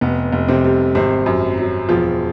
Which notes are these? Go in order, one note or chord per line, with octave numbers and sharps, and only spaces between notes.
F1 B3
F1
C3 C4
G3
G#1 C3 C4
F#2
F#3
E1 F3 F4